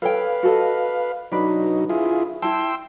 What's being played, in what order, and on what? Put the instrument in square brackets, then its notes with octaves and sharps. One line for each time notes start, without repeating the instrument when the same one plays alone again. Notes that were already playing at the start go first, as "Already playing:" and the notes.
[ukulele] A4 C#5 G5 [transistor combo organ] B4 F5
[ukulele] F#4 A4 D#5
[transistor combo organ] F#3 D#4 [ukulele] D4 B4
[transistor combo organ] E4 F4 G#4
[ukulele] E4 A5 [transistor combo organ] G5 C6 E6